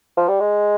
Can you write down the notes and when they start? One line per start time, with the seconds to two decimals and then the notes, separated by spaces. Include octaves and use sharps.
0.17 F3
0.28 G3
0.40 G#3